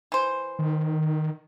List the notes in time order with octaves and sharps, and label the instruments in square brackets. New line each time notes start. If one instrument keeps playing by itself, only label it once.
[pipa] E3 C5
[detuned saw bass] D#3